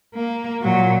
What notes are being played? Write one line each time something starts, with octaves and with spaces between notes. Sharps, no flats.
A#3
A#2 F#3